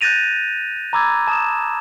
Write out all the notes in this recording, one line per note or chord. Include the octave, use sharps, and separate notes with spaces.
F#6 G6 A6 A#6 D#7 F7
A#5 B5 D6 E6 G#6 A6
A5 D#6 E7